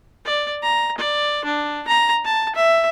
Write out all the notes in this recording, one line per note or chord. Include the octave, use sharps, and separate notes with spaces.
D5
A#5
D5
D4
A#5
A5
E5